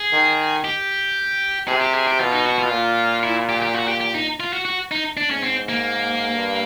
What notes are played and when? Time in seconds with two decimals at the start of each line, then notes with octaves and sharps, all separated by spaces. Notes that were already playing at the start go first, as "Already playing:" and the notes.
Already playing: G#4
0.13 D#3
0.65 G4
1.68 C3 G#4
1.81 G4
1.94 G#4
2.07 G4
2.20 B2 F4
2.32 D#4
2.46 F#4
2.59 F4
2.72 A#2
3.23 E4
3.49 G4
3.62 G4
3.75 F#4
3.88 G4
4.01 G4
4.14 D#4
4.40 F4
4.53 F#4
4.65 F#4
4.91 D#4
5.17 D4
5.30 G#2 C#4
5.43 C4
5.69 A#3
6.34 G2